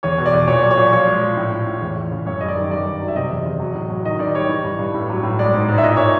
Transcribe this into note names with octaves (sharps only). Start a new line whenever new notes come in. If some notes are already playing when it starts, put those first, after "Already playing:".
E2 C#5
B2
D5
E2
A#2 C#5
F#3
C#5
A#2
F3 C#5
G#3
F3
A2
A2
A2
E2
E2
C#3
F#2 C#5
G3 D#5
D5
D#3
G2 D5
D#3
F#3
E5
C3 D#5
E2
E2
F#3
A2
F#3
D#3 D#5
D#3 D5
G3 C#5
E3
G2
G2
A2
F#3
A2
G#3 D5
G#2
G#2
E5
A#2 D#5
A#2 C#5